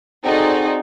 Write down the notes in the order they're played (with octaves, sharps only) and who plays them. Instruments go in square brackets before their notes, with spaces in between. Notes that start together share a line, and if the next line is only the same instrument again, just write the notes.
[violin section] C4 D#4 F#4 G#4 A4 D5